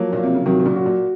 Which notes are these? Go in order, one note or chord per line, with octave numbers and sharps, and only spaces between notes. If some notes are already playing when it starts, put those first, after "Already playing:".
Already playing: F3 F#3 A#3
A#2 F4
C3
C#3
C3 D#3 F#3
D#3
A#2 C#3
F#4
A#2